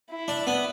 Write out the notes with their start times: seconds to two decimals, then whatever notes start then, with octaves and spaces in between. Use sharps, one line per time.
0.10 E4
0.28 D4
0.47 B3